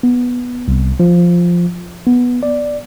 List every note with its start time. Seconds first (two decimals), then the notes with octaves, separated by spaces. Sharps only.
0.03 B3
0.68 C2
1.00 F3
2.07 B3
2.43 D5